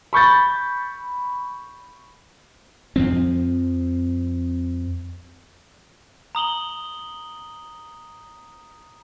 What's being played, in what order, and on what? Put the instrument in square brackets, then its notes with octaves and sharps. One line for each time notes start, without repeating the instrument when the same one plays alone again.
[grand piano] B5 C#6 G6 A6
[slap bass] F2 F3 C4
[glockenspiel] A#5 D#6 F#7 G7